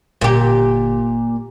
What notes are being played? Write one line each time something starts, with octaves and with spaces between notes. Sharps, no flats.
G1 A#2 G4